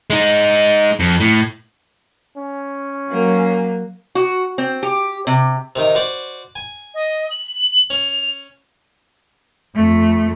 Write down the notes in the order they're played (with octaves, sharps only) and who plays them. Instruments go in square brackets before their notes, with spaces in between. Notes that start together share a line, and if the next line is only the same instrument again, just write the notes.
[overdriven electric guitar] G#3 D#4
F2
A2
[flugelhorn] C#4
[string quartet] F#3 A#3
[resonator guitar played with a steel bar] F#4
C4
G4
C3
[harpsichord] C3 D#3 D#4
F#4 C5 D5
G#5
[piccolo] D#5
F#7
[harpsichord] C#4 [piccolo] F7
[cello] F2 A3